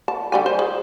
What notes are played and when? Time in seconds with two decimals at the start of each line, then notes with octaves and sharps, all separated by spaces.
0.08 A5
0.32 D3 G3 G#5
0.46 C5
0.59 G#4